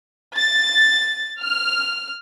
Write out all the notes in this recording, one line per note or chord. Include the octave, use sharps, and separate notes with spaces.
A6
F6